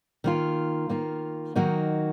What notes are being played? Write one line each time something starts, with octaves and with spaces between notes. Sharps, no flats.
D#3 A#3 F4
D#3 A#3 F4
D#3 F#3 A#3 D#4 F#4